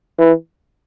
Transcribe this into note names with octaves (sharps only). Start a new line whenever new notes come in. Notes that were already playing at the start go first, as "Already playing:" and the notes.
E3